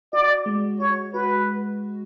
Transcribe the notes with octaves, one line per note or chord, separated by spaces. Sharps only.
F#4 D5
G#3
F#4 C#5
F#4 B4